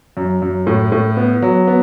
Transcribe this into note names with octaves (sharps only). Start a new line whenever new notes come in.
F#2
F#2
A2
A2
B3
F#3
B3